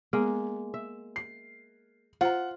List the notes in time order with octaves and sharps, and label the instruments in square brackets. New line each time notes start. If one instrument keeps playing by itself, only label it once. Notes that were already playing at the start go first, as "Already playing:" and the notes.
[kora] G#3 A#3 [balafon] B3
[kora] E5
[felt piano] C7
[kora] F4 [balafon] C5 A#5 [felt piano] F#5